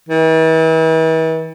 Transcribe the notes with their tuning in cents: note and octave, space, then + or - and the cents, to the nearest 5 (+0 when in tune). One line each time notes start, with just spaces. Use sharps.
E3 -40